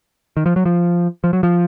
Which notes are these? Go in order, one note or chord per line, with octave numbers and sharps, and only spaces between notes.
D#3
F3
F#3
F3
F3
F#3
F3